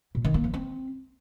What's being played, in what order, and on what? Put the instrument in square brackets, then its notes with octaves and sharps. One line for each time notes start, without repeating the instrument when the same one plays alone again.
[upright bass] A#2
D#3
A#3
F3
C4